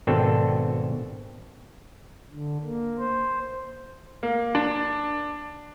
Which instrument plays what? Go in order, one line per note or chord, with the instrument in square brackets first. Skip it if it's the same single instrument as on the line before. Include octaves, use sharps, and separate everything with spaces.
[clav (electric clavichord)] G#1 B2 C4 D4 A4
[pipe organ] D3
A#3
C5
[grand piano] A#3
D4